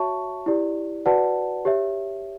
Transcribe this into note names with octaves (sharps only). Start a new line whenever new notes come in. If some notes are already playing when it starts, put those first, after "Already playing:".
Already playing: F#4 C#5 E5 A5 C#6
E4 G4 D5
F#4 B4 D5 F#5 A5
G4 C#5 E5